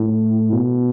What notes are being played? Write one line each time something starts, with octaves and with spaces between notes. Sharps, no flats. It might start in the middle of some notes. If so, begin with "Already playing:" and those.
Already playing: A2
B2